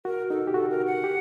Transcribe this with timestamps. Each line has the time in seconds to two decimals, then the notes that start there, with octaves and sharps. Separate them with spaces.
0.05 F#4 A#4
0.30 D#4 A4
0.47 G4
0.54 F#4 A4
0.71 A#4
0.87 F#5
1.04 G4